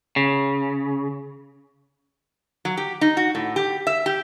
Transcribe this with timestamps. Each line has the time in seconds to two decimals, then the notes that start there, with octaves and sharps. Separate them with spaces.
0.16 C#3
2.65 F#3
2.77 G4
3.01 D#4
3.17 F#4
3.35 A2
3.56 G4
3.87 E5
4.06 G4